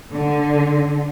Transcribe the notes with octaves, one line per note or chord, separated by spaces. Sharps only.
D3